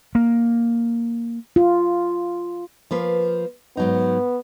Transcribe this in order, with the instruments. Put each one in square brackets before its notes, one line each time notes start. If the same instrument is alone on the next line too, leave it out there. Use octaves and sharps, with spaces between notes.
[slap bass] A#3
[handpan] F4
[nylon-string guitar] F3 A#3 B4
[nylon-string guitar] G#2 F#3 D#4 [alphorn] B3